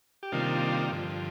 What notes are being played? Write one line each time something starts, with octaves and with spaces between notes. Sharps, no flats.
G4
C3 D#3 G3 A#3 D4 F4
G2 D3 F3